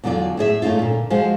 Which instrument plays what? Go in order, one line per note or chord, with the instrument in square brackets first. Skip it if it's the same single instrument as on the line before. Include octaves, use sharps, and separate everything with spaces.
[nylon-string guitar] E2 D3 F#3 F4 D5
A2 G#4 D#5 E5
A2 A3 C#4 D#4 F4
A#2 D3
F3 G#3 F#4 C5 F5